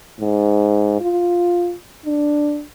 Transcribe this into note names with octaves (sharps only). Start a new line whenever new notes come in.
G#2
F4
D4